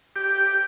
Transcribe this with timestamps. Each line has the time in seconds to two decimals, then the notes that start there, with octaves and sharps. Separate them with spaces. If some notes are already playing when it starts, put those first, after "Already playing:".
0.16 G4